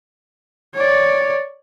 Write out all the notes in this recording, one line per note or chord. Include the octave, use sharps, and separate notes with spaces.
C#5 D5